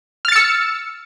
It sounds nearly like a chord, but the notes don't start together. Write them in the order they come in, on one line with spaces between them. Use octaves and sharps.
F6 A6 C#7 E6